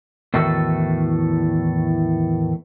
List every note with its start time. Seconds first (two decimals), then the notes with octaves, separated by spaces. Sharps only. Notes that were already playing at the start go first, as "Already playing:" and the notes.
0.34 E2 A2 D#3 A3 F#4 A4